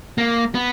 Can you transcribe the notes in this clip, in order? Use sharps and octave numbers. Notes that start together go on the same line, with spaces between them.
A#3
B3